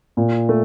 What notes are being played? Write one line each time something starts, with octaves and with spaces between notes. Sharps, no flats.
A#2
A3